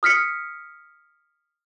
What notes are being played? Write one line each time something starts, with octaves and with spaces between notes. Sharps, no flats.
D#6 F6 B6 C#7